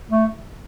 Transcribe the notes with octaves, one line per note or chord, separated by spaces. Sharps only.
A3